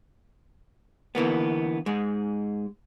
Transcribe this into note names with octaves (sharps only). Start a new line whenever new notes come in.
D3 E3 A#3 B3
G#2 G#3